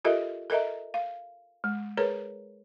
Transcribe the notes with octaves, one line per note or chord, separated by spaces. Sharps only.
F4 G4 A4 A#4 D#5 E5
A4 A#4 D#5 E5 A#5
F5
G#3
G#4 A#4 B4 C#5 A#5